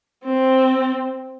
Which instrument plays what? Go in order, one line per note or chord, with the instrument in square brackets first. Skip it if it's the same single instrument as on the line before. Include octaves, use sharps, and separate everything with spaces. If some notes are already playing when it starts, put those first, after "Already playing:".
[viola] C4